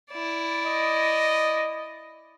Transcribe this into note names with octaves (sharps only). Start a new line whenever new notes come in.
E4 D5
D#5